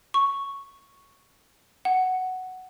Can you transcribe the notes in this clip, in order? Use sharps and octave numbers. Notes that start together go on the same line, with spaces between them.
C#6
F#5